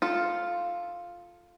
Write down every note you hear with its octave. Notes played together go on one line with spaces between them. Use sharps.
F4 A4